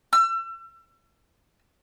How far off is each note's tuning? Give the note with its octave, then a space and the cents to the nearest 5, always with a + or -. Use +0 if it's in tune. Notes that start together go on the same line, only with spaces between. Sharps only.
E6 +35